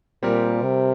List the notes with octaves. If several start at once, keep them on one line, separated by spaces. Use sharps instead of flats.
A#2 G3 C4 G4 A#4
C3